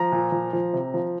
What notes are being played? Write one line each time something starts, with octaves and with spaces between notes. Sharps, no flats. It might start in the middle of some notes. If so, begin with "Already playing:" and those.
Already playing: F3 A#5
A#2
F3
F3
C3
F3